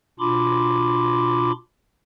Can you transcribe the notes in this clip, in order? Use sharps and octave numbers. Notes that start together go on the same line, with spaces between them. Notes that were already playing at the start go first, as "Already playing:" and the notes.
B2 D4 F4 B5 C6 D6